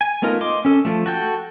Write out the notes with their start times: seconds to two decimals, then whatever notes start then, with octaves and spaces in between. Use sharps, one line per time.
0.01 G#5
0.22 A3 B3 D#4 F4 A#4
0.41 D#5 C6 D6
0.65 C#4 A4
0.85 F3 A3
1.06 F#4 A4 G5